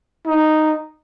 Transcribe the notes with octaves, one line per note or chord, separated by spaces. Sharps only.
D#4